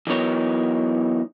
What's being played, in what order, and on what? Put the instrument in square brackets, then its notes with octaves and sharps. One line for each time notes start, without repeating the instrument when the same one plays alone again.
[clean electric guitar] E3 F#3 B3 D#4 A#4 C#5